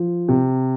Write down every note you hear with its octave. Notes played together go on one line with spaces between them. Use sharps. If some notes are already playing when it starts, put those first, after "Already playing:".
Already playing: F3
C3